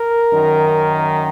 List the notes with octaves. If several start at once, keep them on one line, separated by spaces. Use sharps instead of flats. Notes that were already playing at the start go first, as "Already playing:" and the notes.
Already playing: A#4
F#2 D#3